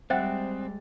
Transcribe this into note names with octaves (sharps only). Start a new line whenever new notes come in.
G3 G#3 C4 C5 E5 F#5 G5 A6